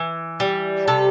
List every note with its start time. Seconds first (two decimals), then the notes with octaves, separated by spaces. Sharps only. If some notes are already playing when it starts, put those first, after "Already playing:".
Already playing: E3
0.40 G3
0.88 C3 A4